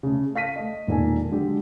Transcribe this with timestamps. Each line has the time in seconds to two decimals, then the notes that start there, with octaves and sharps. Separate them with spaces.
0.03 C#3 A3
0.35 A4 F5 A#6 B6 D#7
0.56 A3 D#5
0.87 E1 A#2 D#3 A#3 A4 G#5
1.31 D3 F#3 G#3 G4